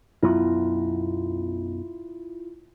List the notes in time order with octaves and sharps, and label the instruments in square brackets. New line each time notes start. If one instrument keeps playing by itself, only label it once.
[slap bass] B1 F#2 B3 [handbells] E4 F4